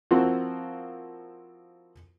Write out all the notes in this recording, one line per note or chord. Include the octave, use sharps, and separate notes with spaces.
F3 A#3 C4 E4 F#4